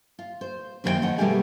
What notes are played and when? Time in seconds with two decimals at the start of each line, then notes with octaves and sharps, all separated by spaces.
0.19 F4
0.41 C5
0.84 F#2 D#3 A#3 B4 C5 G5
1.02 D#2 F3 D#4 F#5
1.18 B2 G3 A3 A#3 G4 G#4